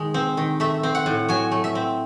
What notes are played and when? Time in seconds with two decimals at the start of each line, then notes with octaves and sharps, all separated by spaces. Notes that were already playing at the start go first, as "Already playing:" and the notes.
Already playing: D#3 G#3
0.14 C4
0.37 D#3
0.60 A3 E5
0.83 C4
0.95 F#5
1.06 A2
1.29 F#3 G#5
1.52 A3
1.64 E5
1.75 C4